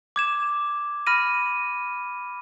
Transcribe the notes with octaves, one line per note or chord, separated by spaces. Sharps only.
D6 G#6 E7
B5 F6 A#6 D#7